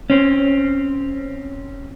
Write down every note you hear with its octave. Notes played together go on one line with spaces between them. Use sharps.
C4 C#4